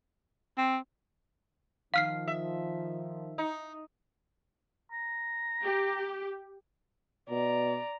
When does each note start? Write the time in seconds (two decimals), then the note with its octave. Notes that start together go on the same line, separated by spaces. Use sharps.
0.58 C4
1.94 D#3 F3 F5 F6 C7
2.28 E5
3.38 D#4
4.92 A#5
5.63 G4
7.30 B2 D5 A#5